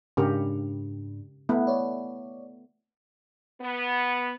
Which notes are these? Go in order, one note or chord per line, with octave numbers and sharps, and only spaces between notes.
G#2 C#3 D4 G4 A#4
A3 B3 E4
C#5 D5
B3